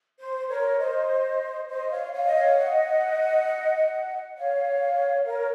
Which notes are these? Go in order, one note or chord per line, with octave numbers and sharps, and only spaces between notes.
C5
A#4 C#5
C5 D#5
C5 D#5
C#5 F5
C#5 F5
D#5
C#5 F5
D#5 F#5
C#5 F5
A#4 C#5